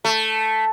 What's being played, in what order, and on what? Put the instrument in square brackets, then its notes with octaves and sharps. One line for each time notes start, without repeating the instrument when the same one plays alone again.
[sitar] A3